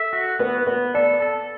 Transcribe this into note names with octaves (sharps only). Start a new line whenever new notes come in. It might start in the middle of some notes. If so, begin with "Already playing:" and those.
Already playing: A4 E5
F#4
B3 B4
B3 B4
A4 D5
A4